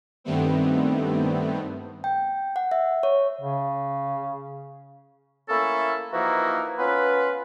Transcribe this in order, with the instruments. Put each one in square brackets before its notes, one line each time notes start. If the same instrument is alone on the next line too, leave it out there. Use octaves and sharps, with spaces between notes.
[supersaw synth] G2 D#3 G3 A3 B3 C4
[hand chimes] G5
F#5
E5
C#5
[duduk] C#3
[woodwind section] A3 A#3 C#4 E4 A4
E3 F3 A#3 D#4 E4 F#4
B3 C#4 F4 B4